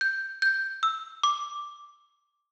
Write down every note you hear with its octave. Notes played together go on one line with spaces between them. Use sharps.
G6
G6
E6
D6